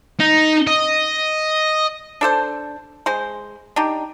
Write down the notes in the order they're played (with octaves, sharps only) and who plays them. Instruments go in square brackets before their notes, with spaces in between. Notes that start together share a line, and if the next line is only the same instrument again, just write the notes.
[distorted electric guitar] D#4
D#5
[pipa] D4 A4 C5
G#3 C5 C6
D4 D#4 G4